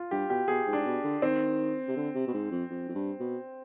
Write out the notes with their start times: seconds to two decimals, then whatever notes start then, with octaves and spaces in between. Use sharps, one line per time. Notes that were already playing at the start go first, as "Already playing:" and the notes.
Already playing: F4
0.11 G2 G4
0.30 B2 G4
0.48 B2 G#4
0.67 G#2
0.73 D4
0.78 G#2
0.85 B2
1.04 D3
1.22 D#3 C4
1.88 C3
1.96 D3
2.15 C3
2.27 B2
2.34 G#2
2.51 F2
2.70 F2
2.89 F2
2.95 G2
3.20 B2